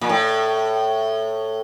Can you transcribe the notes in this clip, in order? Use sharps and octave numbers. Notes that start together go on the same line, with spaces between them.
A#2
A2